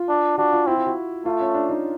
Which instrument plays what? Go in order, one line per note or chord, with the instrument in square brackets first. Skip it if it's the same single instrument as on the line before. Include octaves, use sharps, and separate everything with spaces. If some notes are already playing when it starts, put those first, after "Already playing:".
Already playing: [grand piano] F4
[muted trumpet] D4
[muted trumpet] D4 [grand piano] F#4
[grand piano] F4
[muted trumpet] C4 [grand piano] E4
[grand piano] F4
F#4
[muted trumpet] A3 [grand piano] F4
[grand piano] C#4
D4
D#4